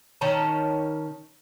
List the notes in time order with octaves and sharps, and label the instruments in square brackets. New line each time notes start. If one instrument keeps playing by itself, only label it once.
[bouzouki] D#3 C#4 A5 A#5